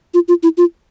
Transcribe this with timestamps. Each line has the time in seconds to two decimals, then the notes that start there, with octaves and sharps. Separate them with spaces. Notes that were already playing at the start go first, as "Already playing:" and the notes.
0.14 F4
0.28 F4
0.43 E4
0.57 F4